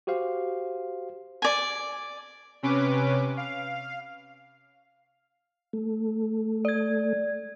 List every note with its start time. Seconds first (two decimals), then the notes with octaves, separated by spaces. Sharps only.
0.07 F#4 G4 C5 F5
1.42 D5 G#5
2.63 C3 C#4 B4 D6
3.37 F5
5.73 A3
6.65 D5 G#6